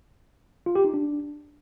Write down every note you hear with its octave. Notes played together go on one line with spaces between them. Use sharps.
F4
G4
D#4
D4